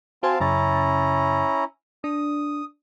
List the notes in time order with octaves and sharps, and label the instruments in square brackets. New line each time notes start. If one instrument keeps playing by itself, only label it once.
[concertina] C4 F5 A5 [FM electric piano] F#4 C5 G#5
[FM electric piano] F#2 C#3 A6 [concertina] C#4 E4 A#5
[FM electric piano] D4 [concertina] D#6